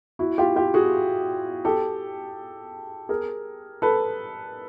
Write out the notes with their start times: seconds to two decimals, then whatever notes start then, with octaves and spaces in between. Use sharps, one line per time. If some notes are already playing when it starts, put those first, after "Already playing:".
0.19 E4 F#4
0.38 F4 G4
0.56 F4 G4
0.74 F#4 G#4
1.65 G4 A4
3.09 G#4 A#4
3.82 A4 B4